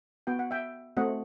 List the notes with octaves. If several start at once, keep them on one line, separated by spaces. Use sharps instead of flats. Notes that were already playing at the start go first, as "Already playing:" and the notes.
B3 F#4 G5
F#5
E5 G5
A3 C4 F#4 D#5 F#5